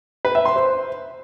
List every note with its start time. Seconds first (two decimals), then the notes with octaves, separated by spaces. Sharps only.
0.25 B4
0.35 E5
0.45 C6
0.56 C5